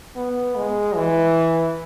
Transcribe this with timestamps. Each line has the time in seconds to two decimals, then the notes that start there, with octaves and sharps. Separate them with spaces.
0.16 B3
0.56 G#3
0.96 E3